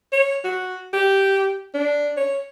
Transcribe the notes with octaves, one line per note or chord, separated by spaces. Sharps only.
C#5
F#4
G4
D4
C#5